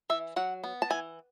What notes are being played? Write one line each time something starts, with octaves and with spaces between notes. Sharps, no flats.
E3 E5
F#3 F#5
B3
A5
E3 G#5